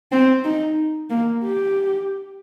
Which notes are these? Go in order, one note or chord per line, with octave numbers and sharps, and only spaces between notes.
C4
D#4
A#3
G4